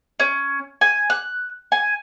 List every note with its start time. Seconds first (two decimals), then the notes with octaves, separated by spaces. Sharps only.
0.20 C#4
0.81 G#5
1.10 F#6
1.72 G#5